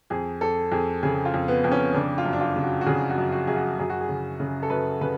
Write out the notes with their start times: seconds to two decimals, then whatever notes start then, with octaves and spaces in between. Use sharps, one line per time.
0.10 F2 G#4
0.41 F2 A4
0.72 F2 G#4
1.03 C#3 G#4
1.25 F4
1.34 F2
1.48 B3
1.64 F2
1.72 C#4
1.94 C#3 D4
2.18 F4
2.25 F#2
2.33 D4
2.41 F4
2.56 C#3
2.63 F#4
2.81 F#4
2.86 C#3 G#4
3.10 F#4
3.18 F#2
3.32 F#4
3.47 F#2 G#4
3.56 F#4
3.79 F#2 G#4
3.90 F#4
4.01 G#4
4.09 C#3
4.40 C#3
4.63 A4
4.70 F#2 B4
5.01 C#3 B4